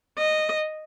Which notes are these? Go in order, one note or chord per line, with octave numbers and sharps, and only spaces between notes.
D#5